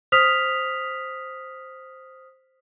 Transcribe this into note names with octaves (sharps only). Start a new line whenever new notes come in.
C5 D#6 F6 B6 F7